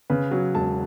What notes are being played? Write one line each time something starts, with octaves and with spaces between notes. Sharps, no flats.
C#3 B4
F#3
E1 A5